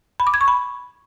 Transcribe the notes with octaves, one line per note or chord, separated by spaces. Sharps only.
B5
D6
G#6
C#6
B5